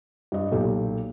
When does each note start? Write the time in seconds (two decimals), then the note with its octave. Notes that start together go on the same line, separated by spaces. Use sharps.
0.32 G2 D#5
0.51 B1 A#2 G4 A4